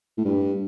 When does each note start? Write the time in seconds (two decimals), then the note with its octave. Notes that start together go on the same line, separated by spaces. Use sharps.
0.17 A2
0.25 G2